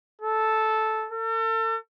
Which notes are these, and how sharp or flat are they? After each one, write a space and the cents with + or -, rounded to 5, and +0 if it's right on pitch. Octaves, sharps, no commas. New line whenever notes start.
A4 -5
A4 +40